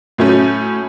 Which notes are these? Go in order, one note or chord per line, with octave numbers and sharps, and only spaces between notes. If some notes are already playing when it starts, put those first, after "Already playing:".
A2 F#3 A3 C#4